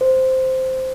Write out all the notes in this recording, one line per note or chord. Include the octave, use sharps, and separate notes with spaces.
C5